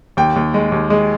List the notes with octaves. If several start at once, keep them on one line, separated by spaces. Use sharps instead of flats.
D#2 G5
D#2
G#3
D#2
G#3